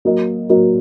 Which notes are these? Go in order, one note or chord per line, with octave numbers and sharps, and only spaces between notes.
F#3 A#3 F#4 A#4 D#5
F#3 A#3 F#4 A#4 D#5